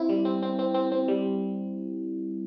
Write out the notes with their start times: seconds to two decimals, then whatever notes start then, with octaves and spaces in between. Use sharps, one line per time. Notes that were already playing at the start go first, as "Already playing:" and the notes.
Already playing: C4 E4
0.09 G3
0.25 C4
0.42 C4
0.59 C4
0.74 C4
0.92 C4
1.08 G3